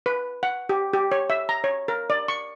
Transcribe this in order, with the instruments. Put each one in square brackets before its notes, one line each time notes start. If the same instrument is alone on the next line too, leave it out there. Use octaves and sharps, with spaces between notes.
[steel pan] B4
F#5
G4
G4
C#5
E5
A#5
C#5
A#4
D5
C#6